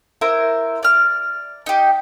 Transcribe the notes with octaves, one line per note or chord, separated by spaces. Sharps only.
E4 A#4 C5
D5 F6
D#4 G4